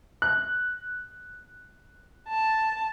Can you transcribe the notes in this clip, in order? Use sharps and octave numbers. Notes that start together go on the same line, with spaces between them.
F#6
A5